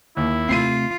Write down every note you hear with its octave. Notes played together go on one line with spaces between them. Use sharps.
D#2 E4
C3 A3 C4 F4 C7 D#7